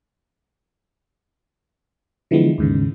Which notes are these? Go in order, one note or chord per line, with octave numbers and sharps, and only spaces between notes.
D3 E3 F3 G#3 B3
D#2 G#2 C#3